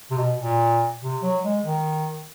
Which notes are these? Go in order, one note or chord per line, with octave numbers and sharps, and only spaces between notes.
C3
B2
A#2
C3
F#3
G#3
D#3